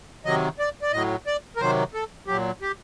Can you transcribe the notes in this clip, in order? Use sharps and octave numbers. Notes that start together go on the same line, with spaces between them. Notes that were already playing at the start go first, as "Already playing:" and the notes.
C3 D#3 F#3 D#5
D5
D5
A2 F#3 D#5
D5
A#4
C3 D#3 F#3 C5
A4
A#2 F#3 G4
G4